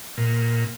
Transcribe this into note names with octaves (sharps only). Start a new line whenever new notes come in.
A#2